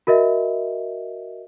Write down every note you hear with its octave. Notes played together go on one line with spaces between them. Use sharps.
F#4 A#4 D#5 E5